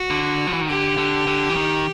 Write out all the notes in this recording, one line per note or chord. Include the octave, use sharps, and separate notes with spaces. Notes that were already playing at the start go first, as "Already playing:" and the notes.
Already playing: F#4
D3
F3
E3
D#3
D3 G4
D3
D3
E3
D#3